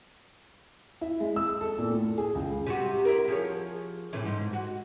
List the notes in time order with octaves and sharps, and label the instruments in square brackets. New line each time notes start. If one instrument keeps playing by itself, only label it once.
[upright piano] E4
G#3
E6
A4
A#2
A2
G#4
C#2
[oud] C3 F#4
E4 A#4
F3 G#4 C#5
A2 C3 E3
G#2
F#4